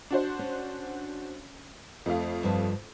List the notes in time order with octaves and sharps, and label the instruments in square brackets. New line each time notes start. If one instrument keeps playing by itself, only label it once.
[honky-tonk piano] D4 F#4 C5
[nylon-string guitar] C#4
[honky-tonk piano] F2 A3 F5
[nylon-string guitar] G2 F3